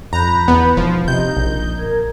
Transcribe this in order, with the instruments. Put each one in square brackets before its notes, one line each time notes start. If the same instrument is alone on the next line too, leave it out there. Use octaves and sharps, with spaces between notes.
[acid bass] F2 [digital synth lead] A#5 [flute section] B5 F#6 G6
[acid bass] E2 [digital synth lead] B3
[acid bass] E1 [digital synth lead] F3 [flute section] C6
[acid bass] C3 [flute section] D#4 [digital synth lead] G6
[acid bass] A#1
[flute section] A#4 G#6